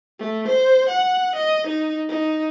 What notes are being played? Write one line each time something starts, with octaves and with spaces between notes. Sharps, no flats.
A3
C5
F#5
D#5
D#4
D#4